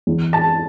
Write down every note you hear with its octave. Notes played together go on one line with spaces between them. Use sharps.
E2
A5